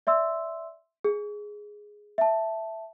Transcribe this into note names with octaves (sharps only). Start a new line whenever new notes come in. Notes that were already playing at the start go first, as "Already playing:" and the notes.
D5 E5 C6 E6
G#4
E5 A5